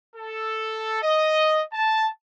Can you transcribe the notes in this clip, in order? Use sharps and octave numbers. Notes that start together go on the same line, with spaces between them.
A4
D#5
A5